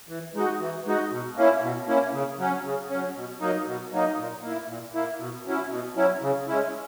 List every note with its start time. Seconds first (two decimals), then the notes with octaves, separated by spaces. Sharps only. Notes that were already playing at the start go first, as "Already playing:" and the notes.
0.09 E3
0.35 G#3 D#4 F#4
0.60 E3
0.86 G#3 D#4 F#4
1.11 B2
1.37 A#3 C#4 E4
1.62 B2
1.87 A#3 C#4 E4
2.13 C#3
2.39 F#3 C#4
2.65 C#3
2.90 F#3 C#4
3.15 B2
3.41 F#3 A#3 D#4
3.67 B2
3.92 F#3 A#3 D#4
4.18 A#2
4.43 A#3 E4
4.69 A#2
4.94 A#3 E4
5.19 B2
5.45 F#3 C#4 E4
5.70 B2
5.96 F#3 C#4 E4
6.22 C#3
6.48 G#3 C#4 E4